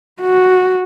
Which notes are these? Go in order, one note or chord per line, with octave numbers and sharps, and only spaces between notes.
F#4